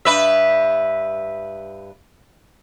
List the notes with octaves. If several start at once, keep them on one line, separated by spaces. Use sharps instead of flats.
G2 B4 E5